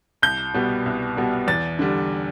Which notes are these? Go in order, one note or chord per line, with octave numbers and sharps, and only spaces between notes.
C2 G6
B2 G3 B3
C2
B2 G3 B3
E2 A6
D3 G3